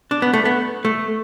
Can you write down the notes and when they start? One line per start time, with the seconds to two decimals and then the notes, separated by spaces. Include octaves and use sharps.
0.11 D4
0.22 B3
0.34 A3
0.45 B3
0.85 A3